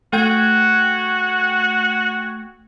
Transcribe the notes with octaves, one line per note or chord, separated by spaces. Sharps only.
A3 F#4 G5 G#6